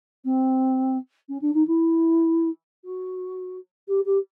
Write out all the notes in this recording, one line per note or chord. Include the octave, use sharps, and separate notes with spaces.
C4
C#4
D4
D#4
E4
F#4
G4
G4